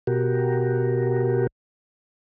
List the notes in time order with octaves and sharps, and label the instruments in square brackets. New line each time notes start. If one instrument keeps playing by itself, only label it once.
[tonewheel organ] B2 F#4 G4 A#4